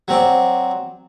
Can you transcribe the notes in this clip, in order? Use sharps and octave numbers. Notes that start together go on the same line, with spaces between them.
F#3 C4 D5